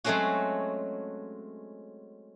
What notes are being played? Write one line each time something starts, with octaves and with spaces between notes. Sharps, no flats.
F#3 G#3 A3 C4 C#4 F#4